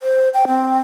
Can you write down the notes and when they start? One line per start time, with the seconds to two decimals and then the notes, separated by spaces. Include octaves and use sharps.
0.01 C5
0.34 G5
0.47 C4